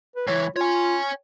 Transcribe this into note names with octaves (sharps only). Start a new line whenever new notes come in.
B4
C#2 E3 C#5
F4 C#5 G#5